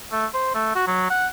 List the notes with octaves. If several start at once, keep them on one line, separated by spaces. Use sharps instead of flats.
A3
C5
A3
F#4
F#3
F#5